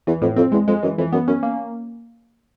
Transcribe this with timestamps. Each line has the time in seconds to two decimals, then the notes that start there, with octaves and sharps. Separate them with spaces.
0.07 E2 E3
0.22 F2 A2
0.36 F2 C4
0.52 E2 G#3
0.67 F2 G#3
0.83 F#2 E3
0.98 F2 E3
1.12 F#2 B3
1.28 F#2 C#4
1.43 A#3